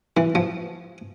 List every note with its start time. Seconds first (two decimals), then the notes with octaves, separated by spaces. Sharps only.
0.17 E3
0.35 F3